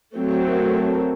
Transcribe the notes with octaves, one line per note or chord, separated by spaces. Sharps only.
F#3 A3 C4
A#4
A4
A#4